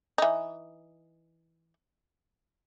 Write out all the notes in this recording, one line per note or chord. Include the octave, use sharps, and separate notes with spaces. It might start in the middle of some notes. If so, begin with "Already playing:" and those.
E3 D#4